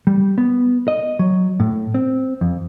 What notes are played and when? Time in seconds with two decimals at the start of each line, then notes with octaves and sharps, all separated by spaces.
0.07 G3
0.38 B3
0.88 D#5
1.19 F#3
1.60 A2
1.94 C4
2.41 F2